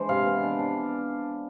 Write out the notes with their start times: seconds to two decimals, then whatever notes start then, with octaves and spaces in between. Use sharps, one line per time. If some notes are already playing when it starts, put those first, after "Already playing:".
Already playing: E3 G#3 D4 C5
0.09 C3 F5
0.26 B3
0.43 D4
0.59 D4